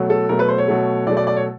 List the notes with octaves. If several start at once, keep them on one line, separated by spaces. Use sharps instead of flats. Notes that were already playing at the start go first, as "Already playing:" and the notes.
Already playing: B2 F#3 A3
A4
B2 F#3 A3 A#4
B4
C5
C#5
B2 F#3 A3
B2 F#3 A3 D5
D5
D5
C#5